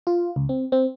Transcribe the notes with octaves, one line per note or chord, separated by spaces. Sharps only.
F4
C#2
C4
C4